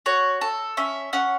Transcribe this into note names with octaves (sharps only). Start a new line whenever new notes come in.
F#4 C#5
A4
C#4 E5
C#4 F#5